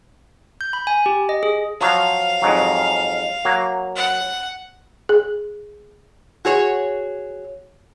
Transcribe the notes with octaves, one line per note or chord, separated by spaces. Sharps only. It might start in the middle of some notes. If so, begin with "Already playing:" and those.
G6
B5
G#5
G4
D#5
G#4
F3 F#3 F5
F2 G#2 F#3
F#3 A#3
F#5
G#4
F#4 G#4 C#5